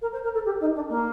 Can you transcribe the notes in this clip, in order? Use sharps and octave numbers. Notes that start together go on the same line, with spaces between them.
A#4
C5
A#4
A4
G4
D#4
D4
A#3